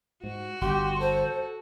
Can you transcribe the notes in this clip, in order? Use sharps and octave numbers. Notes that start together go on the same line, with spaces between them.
G#2 F#4
G1 G4 C6
A4 C5